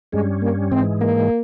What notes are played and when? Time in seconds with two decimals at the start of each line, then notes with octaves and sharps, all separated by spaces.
0.13 G2 G3 G#3 C#4
0.42 A#3
0.71 G#2 E3 G#3 C4
1.01 A#3